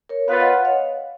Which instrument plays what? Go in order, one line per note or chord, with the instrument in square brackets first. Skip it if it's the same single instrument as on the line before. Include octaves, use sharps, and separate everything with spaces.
[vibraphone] A#4 C#5
[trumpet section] B3 F4 B4 [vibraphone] C#5 F5
[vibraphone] D#5 F#5
D#5 F#5
C#5 F5